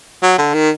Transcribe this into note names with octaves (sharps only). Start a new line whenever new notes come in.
F#3
D3
D#3